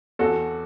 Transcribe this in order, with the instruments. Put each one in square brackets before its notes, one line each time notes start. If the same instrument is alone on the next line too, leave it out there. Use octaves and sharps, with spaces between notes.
[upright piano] E2 F#4 A4